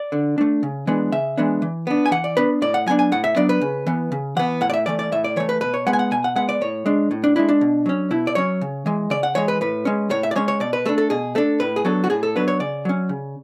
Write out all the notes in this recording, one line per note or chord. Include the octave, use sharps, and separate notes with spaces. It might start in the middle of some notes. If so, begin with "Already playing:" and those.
Already playing: D5
D3
A3 D4
C#3
E3 G#3 B3 D4
C#3 E5
E3 G#3 B3 D4
E3
B3 D4
G#5
E3 F#5
D5
B3 D4 B4
A2 D5
F#5
F#3 B3 D4 G#5
G#5
A2 F#5
E5
F#3 B3 D4 D5
B4
C#3
E3 B3
C#3
E3 B3 F#5
A2 F#5
D5
E5
E3 A3 D5
D5
A2 E5
D5
E3 A3 C#5
B4
B2 B4
C#5
G#3 B3 F#5
G#5
F#5
B2 G#5
F#5
G#3 B3 F#5
D5
A2 C#5
G#3 D4
A2
D4
G#3 D4 E4
D4
B2
F#3 C#4
B2 E4
D5
F#3 C#4 C#5
C#3
E3 G#3
C#3 D5
F#5
E3 G#3 C#5
B4
A2 B4
G#3 C#4
A2 C#5
E5
D5
G#3 C#4 C#5
C#5
B2 D5
B4
A3 D4 A4
A4
B2 G#4
A3 D4 A4
A2 B4
G#4
F#3 B3 D4 A4
F#4
A2 G#4
A4
F#3 B3 D4 B4
C#5
C#3 D5
F#3 C#4
C#3